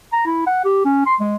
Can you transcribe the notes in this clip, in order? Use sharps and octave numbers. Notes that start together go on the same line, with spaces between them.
A#5
E4
F#5
G4
C#4
C6
G#3